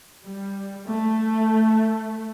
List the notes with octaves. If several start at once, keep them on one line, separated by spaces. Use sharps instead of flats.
G3
A3